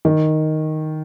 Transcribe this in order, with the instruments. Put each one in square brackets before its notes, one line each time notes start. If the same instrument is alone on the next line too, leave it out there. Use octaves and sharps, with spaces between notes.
[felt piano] D#3